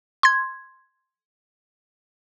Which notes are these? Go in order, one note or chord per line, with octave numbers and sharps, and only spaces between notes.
C6 G#6